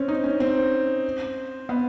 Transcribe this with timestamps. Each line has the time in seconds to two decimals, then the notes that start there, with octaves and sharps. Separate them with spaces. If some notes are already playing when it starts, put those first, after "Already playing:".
Already playing: C4 C#4
0.08 D#4
0.24 C#4
0.40 C4
1.69 B3